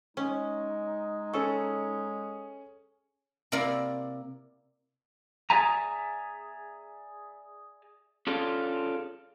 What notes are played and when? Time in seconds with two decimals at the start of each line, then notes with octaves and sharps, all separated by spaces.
0.17 G#3 C#4 D#4
1.33 C#4 G#4 A4 C#6
3.52 C3 A#3 E4 A#4 D5
5.50 G#4 D5 E5 G#5 A#5
8.27 C#4 D4 F4 G#4 A4